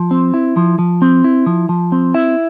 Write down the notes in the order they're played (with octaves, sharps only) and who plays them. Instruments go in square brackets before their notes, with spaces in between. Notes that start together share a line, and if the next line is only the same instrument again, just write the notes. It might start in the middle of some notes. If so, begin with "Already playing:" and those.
Already playing: [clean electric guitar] F3
C4
E4
F3
F3
C4
E4
F3
F3
C4
E4 E5